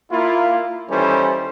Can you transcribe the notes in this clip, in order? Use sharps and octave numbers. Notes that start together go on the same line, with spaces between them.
A#3 E4 F4
D#2 E3 G3 C#4 A4 C5